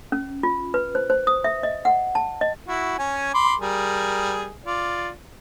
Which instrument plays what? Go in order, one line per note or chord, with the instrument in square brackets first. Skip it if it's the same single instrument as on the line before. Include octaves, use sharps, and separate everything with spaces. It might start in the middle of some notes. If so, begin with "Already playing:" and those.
[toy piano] C#4
F4
B4
C5
C5
D#6
E5
D#5
F#5
A5
D#5
[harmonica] E4 F#4
C#4 G#5
B5 C6 D6
G3 G#4 A#4
F4 D5